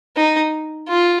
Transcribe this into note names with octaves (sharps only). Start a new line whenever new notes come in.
D#4
F4